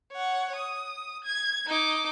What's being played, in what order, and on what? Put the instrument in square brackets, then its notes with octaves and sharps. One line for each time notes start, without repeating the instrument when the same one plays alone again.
[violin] C#5 F#5
D#6
G#6
D#4 D6